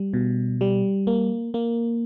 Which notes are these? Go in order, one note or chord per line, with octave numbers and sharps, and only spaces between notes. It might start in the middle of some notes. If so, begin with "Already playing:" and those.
Already playing: G3
B2
G3
A#3
A#3